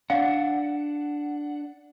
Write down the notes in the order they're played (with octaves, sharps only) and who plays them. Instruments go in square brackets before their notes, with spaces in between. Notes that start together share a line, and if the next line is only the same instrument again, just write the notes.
[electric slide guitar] D4 F#5 [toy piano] F5